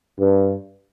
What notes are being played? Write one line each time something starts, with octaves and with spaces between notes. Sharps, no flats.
G2